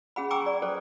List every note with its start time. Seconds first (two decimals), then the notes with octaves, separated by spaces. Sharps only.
0.16 C#4 G#4 F#5 B5
0.30 G5 G#5 A#5 C#6 D6 E6
0.46 D5
0.62 A4 B4 C5 D5